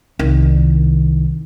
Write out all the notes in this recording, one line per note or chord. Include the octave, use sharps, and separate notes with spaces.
C2 D#3